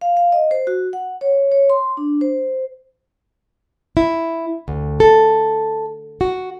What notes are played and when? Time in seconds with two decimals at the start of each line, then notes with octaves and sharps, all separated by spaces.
0.01 F5
0.17 F5
0.32 D#5
0.51 C5
0.67 F#4
0.93 F#5
1.21 C#5
1.52 C#5
1.70 C6
1.97 D4
2.21 C5
3.97 E4
4.68 D2
5.00 A4
6.21 F#4